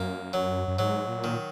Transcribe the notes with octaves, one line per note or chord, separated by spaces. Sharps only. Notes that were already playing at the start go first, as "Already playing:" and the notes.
Already playing: F#2 A#3
F#3
F#2
G#2 F#3
A#2
D#3